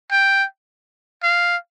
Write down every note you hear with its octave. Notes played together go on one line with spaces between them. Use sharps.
G5
F5